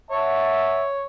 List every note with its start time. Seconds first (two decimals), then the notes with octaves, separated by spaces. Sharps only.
0.11 C#5 E5 F#5 A5